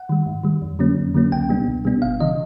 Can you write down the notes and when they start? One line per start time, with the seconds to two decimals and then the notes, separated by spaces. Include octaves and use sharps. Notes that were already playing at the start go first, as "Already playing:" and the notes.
Already playing: F#5
0.09 D#3 G3
0.26 G#2
0.43 D#3 G3
0.62 F2
0.79 D3 F#3 A#3 C#4
0.97 F2
1.14 D3 F#3 A#3 C#4
1.32 C#2 G5
1.49 B2 G3 B3 D4
1.67 C#2
1.85 B2 G3 B3 D4
2.02 G1 F5
2.20 C#3 E3 D#5